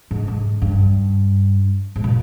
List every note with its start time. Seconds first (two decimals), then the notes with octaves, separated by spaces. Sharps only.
0.11 G#2
0.28 G#2
0.62 G2
1.96 G#2
2.04 A#2